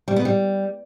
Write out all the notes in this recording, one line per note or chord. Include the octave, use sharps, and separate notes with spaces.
G3
B3
G3